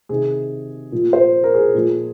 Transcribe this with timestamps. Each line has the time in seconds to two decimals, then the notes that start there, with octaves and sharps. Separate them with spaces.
0.09 C3 D#3 G#4
0.92 A#2 F3
1.13 C5
1.44 A#4
1.54 G#4
1.75 A#2 F3